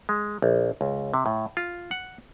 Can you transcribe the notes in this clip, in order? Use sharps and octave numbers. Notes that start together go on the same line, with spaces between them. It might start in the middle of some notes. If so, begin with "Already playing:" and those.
G#3
A#1
C#2
C3
A2
F4
F#5